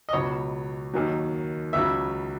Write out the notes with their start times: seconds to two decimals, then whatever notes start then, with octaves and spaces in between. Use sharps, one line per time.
0.09 D#5
0.13 C#2 B2 F#3 C#5
0.94 D#2 D#3 F#3
1.73 C#2 C#3 F#3 E5